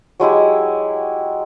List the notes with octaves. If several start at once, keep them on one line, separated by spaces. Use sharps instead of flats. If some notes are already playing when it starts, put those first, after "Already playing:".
F#3 G#3 E4 G4